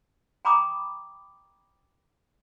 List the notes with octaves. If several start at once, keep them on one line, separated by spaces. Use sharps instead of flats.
G5 A#5 B5 D6 D#6